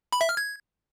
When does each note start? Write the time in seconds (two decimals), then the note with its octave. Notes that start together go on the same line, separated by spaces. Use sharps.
0.12 B5
0.21 E5
0.29 F6
0.37 G#6